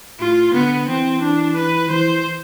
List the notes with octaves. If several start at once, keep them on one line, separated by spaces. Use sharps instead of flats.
A2 F4
D3 B3
E3 C4
D4
B4
E3 C5